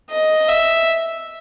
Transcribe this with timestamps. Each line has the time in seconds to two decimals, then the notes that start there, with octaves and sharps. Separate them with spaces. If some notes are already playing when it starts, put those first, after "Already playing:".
0.11 D#5
0.48 E5